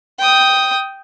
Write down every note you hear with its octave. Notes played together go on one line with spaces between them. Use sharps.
G5 D#6